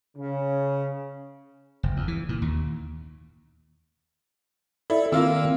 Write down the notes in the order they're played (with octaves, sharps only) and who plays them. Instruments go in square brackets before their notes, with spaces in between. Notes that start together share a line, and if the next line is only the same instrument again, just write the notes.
[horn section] C#3
[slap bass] F#1
E2
E3
A#2
D#2
[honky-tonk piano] E4 [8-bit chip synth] A4 D5
[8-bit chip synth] D#3 C4 [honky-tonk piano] A#3 F4 E6